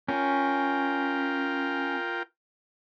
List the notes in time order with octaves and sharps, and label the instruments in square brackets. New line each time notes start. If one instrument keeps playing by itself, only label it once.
[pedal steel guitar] C#4 [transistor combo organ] F4 A#4 G5